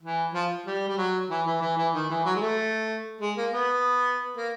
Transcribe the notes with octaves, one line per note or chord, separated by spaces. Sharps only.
E3
F3
G3
G3
F#3
E3
E3
E3
E3
D#3
E3
F#3
G#3
A3
G#3
A#3
B3
A#3